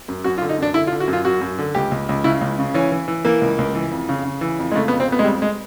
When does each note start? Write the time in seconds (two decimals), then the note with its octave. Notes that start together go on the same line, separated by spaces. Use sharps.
0.08 F#2
0.24 F#2 F#4
0.38 F4
0.42 D3
0.49 D#4
0.58 F#2 D4
0.74 D3 E4
0.87 F4
0.92 D3
1.00 F#4
1.08 F#2
1.13 F4
1.25 F#2 F#4
1.41 F#2
1.58 D3
1.75 C#2 G4
1.91 C#2
2.09 C#2
2.24 C#3 E4
2.41 C#2
2.59 C#3
2.74 E3 C#4
2.92 E3
3.08 E3
3.25 E3 A#3
3.41 C#2
3.58 C#2
3.75 E3
3.91 F2
4.09 C#3
4.25 C#3
4.41 E3
4.59 F2
4.72 G#3
4.75 C#3 A3
4.88 B3
4.92 F2
5.00 C4
5.08 F2 B3
5.19 G#3
5.24 F2 G3
5.42 G#3